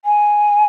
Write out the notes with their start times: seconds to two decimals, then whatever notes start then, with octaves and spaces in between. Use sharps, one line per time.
0.04 G#5